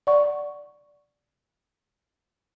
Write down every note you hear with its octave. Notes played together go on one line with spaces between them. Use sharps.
D5 F#5 C#6